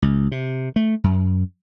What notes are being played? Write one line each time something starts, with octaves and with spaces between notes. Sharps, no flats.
C#2
C3
A3
F#2